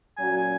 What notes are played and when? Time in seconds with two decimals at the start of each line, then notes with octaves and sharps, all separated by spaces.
0.17 A#2 F#3 C#4 F#4 G#5
0.37 G#5